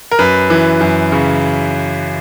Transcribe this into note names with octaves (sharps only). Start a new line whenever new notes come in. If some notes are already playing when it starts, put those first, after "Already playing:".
A#4
F#2 B4
E3
F#2
C#3